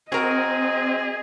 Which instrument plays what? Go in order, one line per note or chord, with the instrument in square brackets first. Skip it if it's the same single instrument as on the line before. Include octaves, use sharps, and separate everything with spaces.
[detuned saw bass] C4 [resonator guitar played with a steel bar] F#4 A#4 [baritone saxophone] G#4 [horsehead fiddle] D#5